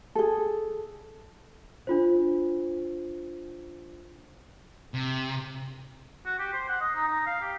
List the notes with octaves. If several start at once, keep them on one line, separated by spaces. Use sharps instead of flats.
G#4 A4
D4 F4 C5
C3
F#4
G4
C5
F#5
D#5
D#4
D#4
F5
G4